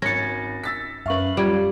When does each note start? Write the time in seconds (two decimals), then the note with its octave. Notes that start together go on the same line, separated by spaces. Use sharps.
0.02 G#1 C#4 A6 A#6 C#7
0.64 E6 A6 B6
1.06 F#2 C#4 B4 E5 F5 C#6 F#7
1.37 G3 F4 G#6